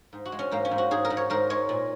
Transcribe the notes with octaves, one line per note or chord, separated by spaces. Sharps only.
G#2
F#4
G#3
C#4
G#2 A#3
C#4
G#2
F#4
G#2 G#4
A#4
G#2
C#5
G#2 A#4
G#3 C#5
A#2